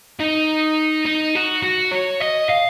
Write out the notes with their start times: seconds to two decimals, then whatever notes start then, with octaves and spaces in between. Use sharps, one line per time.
0.20 D#4
1.05 D#4
1.35 F#4
1.63 F#4
1.91 C#5
2.21 D#5
2.49 F5